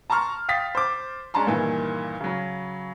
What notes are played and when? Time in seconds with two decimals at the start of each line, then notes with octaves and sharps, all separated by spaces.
0.10 A5 A#5 C6 C#6 F6
0.49 F5 G5 D#6 A6 B6 C7
0.75 C5 D6
1.34 G#3 C#4 D4 A5 A#5 C6
1.47 G2 A#2 D#3 E3
2.21 C#3 F#3